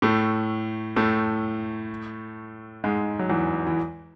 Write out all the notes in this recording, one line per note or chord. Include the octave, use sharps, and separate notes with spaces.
A2 A3
A2 A3
G#2 G#3
F#3
E2 E3
E3